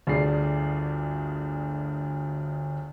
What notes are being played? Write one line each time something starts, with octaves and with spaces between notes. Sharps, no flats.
G1 D2 D4 G#4 D5 C7